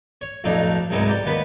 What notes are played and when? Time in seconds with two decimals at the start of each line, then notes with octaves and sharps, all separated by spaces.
0.21 C#5
0.44 B1 F2 A2 D4 D#4
0.90 C2 G#2 C3 F#3 G#3 B3
1.09 G4 D5
1.25 D#2 B3 B4 B5